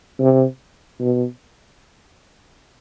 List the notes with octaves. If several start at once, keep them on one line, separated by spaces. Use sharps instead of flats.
C3
B2